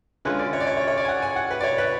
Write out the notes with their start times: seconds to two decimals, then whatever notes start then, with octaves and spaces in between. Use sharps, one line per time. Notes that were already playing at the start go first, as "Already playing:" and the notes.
0.25 D3 G#3 C#4 F4 B4
0.39 D5
0.53 C#5
0.60 D5
0.67 C#5
0.77 C#5
0.88 C#5
0.98 D5
1.05 G#5
1.08 F#5
1.22 G#5
1.36 F#5
1.51 B4
1.61 D5
1.64 C#5
1.78 B4